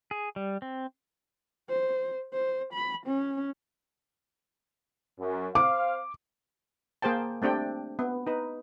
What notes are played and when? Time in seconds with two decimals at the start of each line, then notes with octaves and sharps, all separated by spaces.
0.11 G#4
0.36 G3
0.62 C4
1.70 C5
2.33 C5
2.73 B5
3.07 C#4
5.19 F#2
5.55 C5 F5 D6
7.02 A#3 G#4 C5 G5 A5
7.42 A3 C4 D4 G4 G5
7.99 B3
8.27 D#4 B4